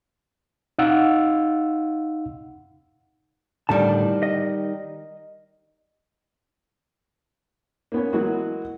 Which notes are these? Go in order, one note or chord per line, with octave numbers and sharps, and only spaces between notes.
D#4 F5 F#5 E6
A2 D3 D#3 G3 A5
D#5
A#3 B3 C#4
E3 F#3 G#3 A#3 F#4